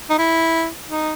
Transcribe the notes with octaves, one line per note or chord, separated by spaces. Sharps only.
D#4
E4
D#4